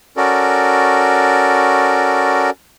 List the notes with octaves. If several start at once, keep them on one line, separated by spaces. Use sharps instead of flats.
C#4 F#4 A4 A#4 D5